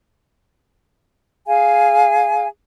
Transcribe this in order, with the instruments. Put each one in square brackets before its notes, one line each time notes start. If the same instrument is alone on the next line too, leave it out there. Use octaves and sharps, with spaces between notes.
[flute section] G#4 F5 G#5